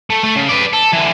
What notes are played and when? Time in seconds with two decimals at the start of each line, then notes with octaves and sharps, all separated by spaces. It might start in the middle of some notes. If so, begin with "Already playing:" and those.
0.10 A3
0.24 A3
0.35 C#3
0.49 B4 D5
0.73 A4
0.93 D3 E3